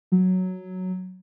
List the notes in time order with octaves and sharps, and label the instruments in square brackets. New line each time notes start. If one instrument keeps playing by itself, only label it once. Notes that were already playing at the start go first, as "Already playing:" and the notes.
[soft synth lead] F#3